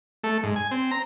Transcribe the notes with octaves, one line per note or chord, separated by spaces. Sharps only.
A3
G#2
G#5
C4
A#5